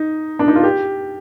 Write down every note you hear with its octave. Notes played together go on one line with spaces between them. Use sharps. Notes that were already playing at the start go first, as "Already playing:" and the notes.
Already playing: D#4
D4
D#4
F4
G4